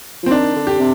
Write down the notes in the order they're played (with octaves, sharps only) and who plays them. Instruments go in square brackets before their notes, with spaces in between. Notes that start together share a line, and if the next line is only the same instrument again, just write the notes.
[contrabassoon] F3
[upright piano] C4
[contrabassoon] D#3 [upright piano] D4
[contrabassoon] D3
[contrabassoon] D3 [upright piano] G4
[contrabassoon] C3